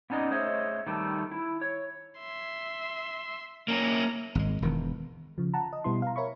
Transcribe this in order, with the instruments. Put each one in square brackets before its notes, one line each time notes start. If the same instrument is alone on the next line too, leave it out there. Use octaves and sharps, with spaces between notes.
[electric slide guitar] B3 C#4 D#4 D5 D#5
A3 G#4 C5 C#5 D#5 E5
D#3 G3 A3 A5
E4
C#5
[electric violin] E5 C6
[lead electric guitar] A#3 C#4 [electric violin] A#5
[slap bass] G#1 G#3
E1 D#3
[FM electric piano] C#3 F3
F#5 A5 A#5
D#5
B2 G3 B3 E4 C6
F5 A#5
A#4 C#5 E5 B5 C#6